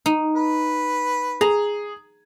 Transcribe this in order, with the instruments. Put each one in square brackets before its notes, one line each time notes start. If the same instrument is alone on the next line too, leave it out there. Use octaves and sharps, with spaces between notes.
[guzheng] D#4
[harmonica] B4
[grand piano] G#4 [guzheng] A#5